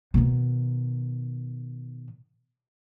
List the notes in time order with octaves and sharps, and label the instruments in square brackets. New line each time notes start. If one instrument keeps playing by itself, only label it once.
[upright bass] B2 D#3